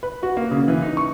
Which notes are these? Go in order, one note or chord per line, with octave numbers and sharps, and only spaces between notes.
B4
F#4
A#3
C#3
E3
D#4
C#6